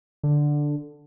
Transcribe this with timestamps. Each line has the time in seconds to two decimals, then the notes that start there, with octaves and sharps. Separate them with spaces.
0.23 D3